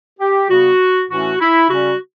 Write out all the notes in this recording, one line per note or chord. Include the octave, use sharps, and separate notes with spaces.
G4
C#3 G3 B3 F#4
A2 E3 A3 C#4 F#4
E4
C#3 G3 C#4 F#4